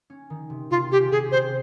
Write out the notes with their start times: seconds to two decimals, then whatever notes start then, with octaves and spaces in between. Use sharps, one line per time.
0.10 C#4
0.30 D#3
0.50 C3
0.70 C3 F4
0.91 C#4 G4
1.11 C3 G#4
1.31 C3 C5